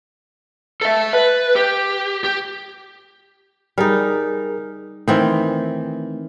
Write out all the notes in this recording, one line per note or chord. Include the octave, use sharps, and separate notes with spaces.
A4 E5
B4
G4
G4
G3 D#4 G#4 A#4 F6
D#3 E3 A3 C4